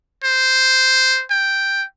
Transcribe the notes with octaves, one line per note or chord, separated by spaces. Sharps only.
C5
G5